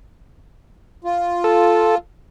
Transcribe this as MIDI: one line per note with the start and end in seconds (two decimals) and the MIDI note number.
1.04 1.97 65
1.44 1.95 69